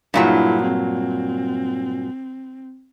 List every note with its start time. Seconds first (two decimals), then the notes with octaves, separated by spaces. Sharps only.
0.14 G2 A#2 F#3 E4 G#4
0.62 C4